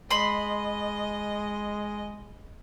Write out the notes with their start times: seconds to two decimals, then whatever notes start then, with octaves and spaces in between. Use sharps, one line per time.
0.11 G#3 D#5 B5 C6